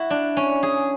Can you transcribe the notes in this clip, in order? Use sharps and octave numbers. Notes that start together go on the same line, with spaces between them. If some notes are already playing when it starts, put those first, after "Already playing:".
Already playing: E4 F#4
D4
C#4
G#4